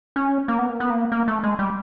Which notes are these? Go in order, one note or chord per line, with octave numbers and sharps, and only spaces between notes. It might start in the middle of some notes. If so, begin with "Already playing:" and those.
C#4
A#3
B3
A#3
B3
A#3
A#3
A3
G#3
G3